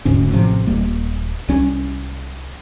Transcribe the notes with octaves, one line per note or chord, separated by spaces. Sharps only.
D#1 D2 G#2 C#4
A1 A2 C3 F3
D#1 G3 A#3
C2 G3 C#4